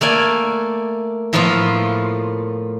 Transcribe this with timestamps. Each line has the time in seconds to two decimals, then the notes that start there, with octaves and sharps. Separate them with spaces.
0.01 A3 A#3 D5 G#5
1.33 A2 F3 A#3 B3 F4